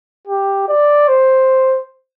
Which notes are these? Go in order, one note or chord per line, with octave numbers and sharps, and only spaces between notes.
G4
D5
C5